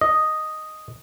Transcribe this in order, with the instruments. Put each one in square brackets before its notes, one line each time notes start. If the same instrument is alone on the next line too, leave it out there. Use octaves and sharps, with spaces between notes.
[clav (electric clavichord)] D#5